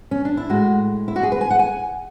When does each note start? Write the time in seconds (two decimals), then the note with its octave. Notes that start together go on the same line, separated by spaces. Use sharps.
0.11 C#4
0.25 D4
0.37 E4
0.50 A2 G#3 F#4
1.08 E4
1.16 F#4
1.23 G#4
1.32 B4
1.41 G#5
1.50 F#5
1.59 G#5